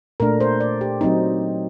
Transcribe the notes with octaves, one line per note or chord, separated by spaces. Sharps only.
A#2 A3 D4 A#4
C5
D5
G4
F#3 C4 D#4